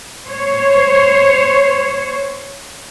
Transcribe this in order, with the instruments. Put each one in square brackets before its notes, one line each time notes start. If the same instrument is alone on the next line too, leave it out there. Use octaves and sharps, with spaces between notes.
[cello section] C5 C#5